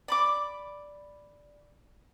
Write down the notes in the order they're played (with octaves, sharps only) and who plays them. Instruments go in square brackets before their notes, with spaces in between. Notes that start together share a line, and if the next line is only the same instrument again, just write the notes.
[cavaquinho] D5 B5 D6